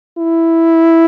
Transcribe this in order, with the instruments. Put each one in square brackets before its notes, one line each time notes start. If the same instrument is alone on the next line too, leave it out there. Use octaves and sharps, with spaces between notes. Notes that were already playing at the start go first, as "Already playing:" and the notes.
[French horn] E4